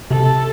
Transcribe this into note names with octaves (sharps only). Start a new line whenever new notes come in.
C3 A4